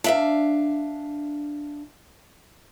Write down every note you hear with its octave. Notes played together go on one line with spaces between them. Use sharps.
D4 E5 F5